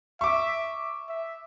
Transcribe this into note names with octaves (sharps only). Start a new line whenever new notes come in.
E5 C#6 D6
E5